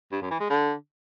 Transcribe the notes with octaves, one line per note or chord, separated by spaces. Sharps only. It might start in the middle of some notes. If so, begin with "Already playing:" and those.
G2
F#2
E3
G#3
D3